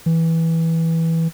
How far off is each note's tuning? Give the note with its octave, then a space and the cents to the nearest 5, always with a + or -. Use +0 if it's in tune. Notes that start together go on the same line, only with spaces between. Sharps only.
E3 -10